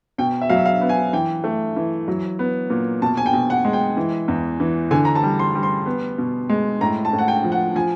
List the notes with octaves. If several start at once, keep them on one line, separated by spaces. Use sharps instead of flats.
B2 G5
E5
F#3 F5
E5
F5
B3
G#5
E3 G5
A3
E3
F#3
B3
A#2
B2 A5
G#5
G5
B2
F#5
G#3
G5
E3
E2
E3
D3 G#5
A#5
A5
G3
C6
G3
C6
B3
B2
G#3
A2 A#5
A5
A2
F#5
G5
F3
F#5
F3 G#5